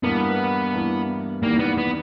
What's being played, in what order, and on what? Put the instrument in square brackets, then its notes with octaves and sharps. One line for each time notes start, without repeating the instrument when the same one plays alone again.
[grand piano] G2 E3 A#3 [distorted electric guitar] B3
[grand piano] G2 E3 A#3
[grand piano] E2 D#3 G3 [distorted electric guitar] A#3
[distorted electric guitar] B3
B3